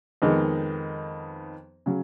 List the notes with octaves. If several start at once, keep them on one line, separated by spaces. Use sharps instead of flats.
F2 D#3 G#3 B3 D#4
C#3 F#3